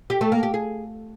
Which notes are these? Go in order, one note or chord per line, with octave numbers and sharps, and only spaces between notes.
G4
A3
A#3
G4
G#4